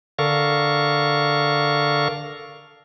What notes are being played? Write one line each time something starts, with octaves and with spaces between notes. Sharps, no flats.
D3 A4 A#4 F5 C#6